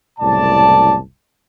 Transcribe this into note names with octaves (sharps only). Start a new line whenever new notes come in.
F#1 C2 A2 D5 A5